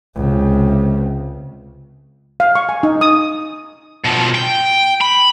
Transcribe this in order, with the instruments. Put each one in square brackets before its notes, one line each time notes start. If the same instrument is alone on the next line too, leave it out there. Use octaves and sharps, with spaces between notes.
[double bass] C#2 C3
[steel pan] F5
C#6
G#5
D#4
D#6
[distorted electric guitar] B2 F3
G5
B5